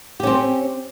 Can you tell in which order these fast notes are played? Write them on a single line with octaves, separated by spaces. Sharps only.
G4 C#4 C4